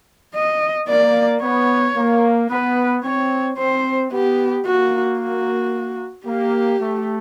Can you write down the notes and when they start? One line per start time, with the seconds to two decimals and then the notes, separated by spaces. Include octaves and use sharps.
0.35 D#5
0.88 A#3 D5
1.42 B3 C#5
1.97 A#3
2.50 B3 B4
3.03 C4 C#5
3.58 C4 C5
4.11 B3 G4
4.66 A#3 F#4
5.19 F#4
6.27 A#3 G4
6.81 A3